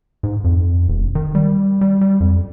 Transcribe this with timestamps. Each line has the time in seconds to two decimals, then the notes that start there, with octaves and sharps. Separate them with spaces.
0.23 G#2
0.44 F2
0.88 E1
1.15 D#3
1.35 G3
1.81 G3
2.01 G3
2.20 F2